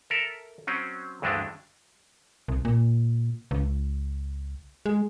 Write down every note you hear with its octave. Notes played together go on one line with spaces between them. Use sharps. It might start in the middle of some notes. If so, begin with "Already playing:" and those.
A4 A#4 E5
F#3 C4 C#4
D2 G2 E3 G#3 A3 D4
C2
A#2
C#2
G#3